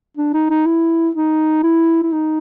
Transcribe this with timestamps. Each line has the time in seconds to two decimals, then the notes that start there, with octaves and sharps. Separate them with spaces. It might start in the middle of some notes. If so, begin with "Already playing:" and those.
0.17 D4
0.34 D#4
0.50 D#4
0.66 E4
1.15 D#4
1.63 E4
2.03 E4
2.12 D#4